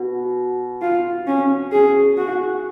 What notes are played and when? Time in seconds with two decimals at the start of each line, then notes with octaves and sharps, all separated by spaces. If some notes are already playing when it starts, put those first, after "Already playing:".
Already playing: B2
0.82 F4
1.27 C#4
1.72 G#4
2.18 F#4